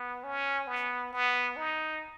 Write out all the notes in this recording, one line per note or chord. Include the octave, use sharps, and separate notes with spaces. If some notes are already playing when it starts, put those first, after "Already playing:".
Already playing: B3
C#4
B3
B3
D#4